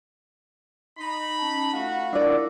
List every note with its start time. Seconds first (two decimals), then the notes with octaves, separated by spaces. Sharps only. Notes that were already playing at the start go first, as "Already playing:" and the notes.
0.98 D#4 B5
1.38 C#4 A5
1.73 A3 F4 F#4 F5 F#5
2.13 D4 E4 A#4 D5 D6